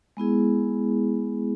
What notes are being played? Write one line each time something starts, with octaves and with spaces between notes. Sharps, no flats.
G#3 B3 E4 G#4